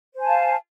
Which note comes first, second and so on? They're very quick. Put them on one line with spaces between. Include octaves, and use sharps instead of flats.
C5 G#5 A5 F5